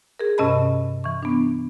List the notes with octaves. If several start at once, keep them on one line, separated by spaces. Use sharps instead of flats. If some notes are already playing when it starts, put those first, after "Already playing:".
G#4 A#4
G2 C3 C#4 D#5 A5 B5
E3 C#6
B3 D4